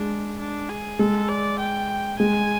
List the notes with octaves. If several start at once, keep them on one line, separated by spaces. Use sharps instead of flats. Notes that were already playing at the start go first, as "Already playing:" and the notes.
Already playing: G#3 D4
D4
G#4
G#3 A4
D5
G5
G#3 G#5